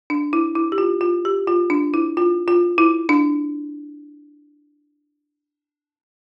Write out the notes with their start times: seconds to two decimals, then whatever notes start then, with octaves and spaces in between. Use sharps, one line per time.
0.10 D4
0.33 E4
0.55 E4
0.72 G4
0.78 F4
1.01 F4
1.25 G4
1.47 F4
1.70 D4
1.94 E4
2.17 F4
2.48 F4
2.78 E4
3.09 D4